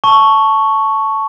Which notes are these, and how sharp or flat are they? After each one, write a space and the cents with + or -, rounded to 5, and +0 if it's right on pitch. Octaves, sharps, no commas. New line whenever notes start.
A5 +0 C#6 +0